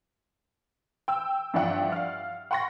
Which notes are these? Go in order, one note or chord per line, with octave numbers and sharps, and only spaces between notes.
G5 E6
G2 F3 E4 D5 F#5 G5
F5 F6
F#5 G5 C6 C#6 A#6